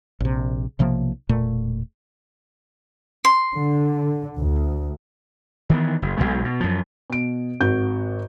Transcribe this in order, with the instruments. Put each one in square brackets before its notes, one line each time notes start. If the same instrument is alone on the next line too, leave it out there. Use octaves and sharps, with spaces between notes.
[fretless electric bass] A#1 C3
B1 C3 F3 A#3
E1 A#2 A3
[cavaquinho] C6
[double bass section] D3
D2
[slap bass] D#3 E3 B3
F#1
B1 E2 B2 G#3
B2
F#2 F3
[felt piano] B2 D7
G#1 F#4 G6